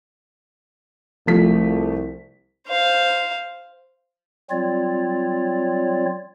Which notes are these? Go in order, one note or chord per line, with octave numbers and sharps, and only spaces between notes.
C2 F3 A3 B6
C5 F5
F#3 G3 C4 F4 C#5 D5